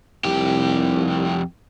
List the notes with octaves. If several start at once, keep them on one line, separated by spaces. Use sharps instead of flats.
C2 F2 G4